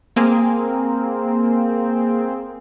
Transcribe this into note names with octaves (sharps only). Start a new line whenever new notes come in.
A#3 C4 G#4